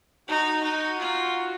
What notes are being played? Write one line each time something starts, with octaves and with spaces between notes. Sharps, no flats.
D#4 F#4
D#4 F#4
F4